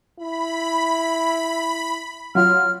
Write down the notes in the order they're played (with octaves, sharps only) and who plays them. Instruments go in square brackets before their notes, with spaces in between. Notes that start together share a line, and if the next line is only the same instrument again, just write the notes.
[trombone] E4 [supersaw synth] B5
[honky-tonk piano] F#3 F4 [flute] F6